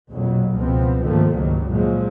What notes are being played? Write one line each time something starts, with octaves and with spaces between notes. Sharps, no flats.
A#1 F2 B2 F#3
C#2 B2 F3 B3 C4
G#2 D3 D#3 F3 A3 A#3
G#1 C#2 G2 D#3 F#3
A#2 F3 F#3 G#3